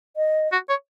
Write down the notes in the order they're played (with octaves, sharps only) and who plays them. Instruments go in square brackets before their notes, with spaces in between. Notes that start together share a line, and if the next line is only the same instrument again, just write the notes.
[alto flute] D#5
[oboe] F#4
C#5